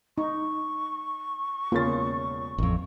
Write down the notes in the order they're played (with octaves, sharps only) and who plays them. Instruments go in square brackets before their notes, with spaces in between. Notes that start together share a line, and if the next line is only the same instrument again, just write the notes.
[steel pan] D#4 [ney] C#6
[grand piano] E1 C#3 A6 [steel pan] A#3 F4
[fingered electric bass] A1 F2